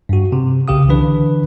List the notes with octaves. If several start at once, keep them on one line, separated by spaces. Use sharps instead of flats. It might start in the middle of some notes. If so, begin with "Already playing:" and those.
G2 F#4
C3
C2 C#3 G4 F5 D#6
D3 E3 D4 B4